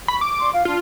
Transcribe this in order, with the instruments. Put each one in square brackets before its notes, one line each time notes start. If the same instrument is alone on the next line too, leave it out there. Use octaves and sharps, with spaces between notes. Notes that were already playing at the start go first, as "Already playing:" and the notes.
[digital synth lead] B5 [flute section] C#6
[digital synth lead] D6
[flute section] D5 C6 C#6
F4 F5
[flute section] D4 F6 [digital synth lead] F4